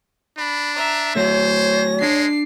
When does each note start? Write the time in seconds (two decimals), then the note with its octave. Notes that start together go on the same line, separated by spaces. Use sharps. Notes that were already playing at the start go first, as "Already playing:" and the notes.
0.38 D4 B5
0.76 E5 A#5
1.16 F#3 A3 C5 C#5 A#6
2.01 G#3 D4 C7